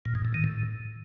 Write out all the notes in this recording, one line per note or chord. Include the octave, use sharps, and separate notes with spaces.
A#2
G#2
A2
D#3
A2